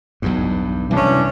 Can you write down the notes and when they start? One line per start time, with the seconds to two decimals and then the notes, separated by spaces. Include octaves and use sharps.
0.22 B1 E2 G2
0.91 C2 F#2 A2 E3 C#4 D4